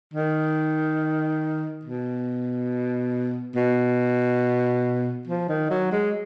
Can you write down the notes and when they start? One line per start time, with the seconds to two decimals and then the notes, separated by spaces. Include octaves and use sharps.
0.13 D#3
1.85 B2
3.56 B2
5.27 F3
5.49 D#3
5.70 F#3
5.92 G#3